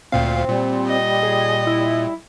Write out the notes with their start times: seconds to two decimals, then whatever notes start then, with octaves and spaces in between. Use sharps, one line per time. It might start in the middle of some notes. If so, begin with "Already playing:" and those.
0.12 D2 A#2 C4 F5
0.48 A#2 G3
0.87 D#5
1.23 G#4
1.67 E4